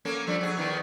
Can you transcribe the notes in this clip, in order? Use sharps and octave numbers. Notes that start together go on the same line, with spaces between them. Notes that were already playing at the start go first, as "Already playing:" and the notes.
A#3 C#4 A4
F3 G3 D4
F#3 G#4
E2 D#3 E3